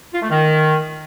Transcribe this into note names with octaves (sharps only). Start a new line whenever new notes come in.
F4
A3
D#3